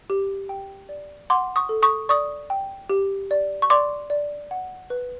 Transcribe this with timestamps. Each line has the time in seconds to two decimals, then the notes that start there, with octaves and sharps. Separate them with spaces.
0.10 G4
0.49 G5
0.89 D5
1.30 F#5 C6 D6
1.56 C#6 D#6
1.69 A4
1.82 C#6 D#6
2.09 D5 C#6 D#6
2.50 G5
2.90 G4
3.31 D5
3.62 C#6
3.70 D5 C6 D6
4.10 D5
4.51 F#5
4.90 B4